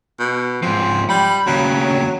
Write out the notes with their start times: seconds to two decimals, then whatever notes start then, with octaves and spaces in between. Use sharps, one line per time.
0.19 B2
0.62 G#2 F3 C4
1.09 G3 B5
1.47 D#2 C#3 F#3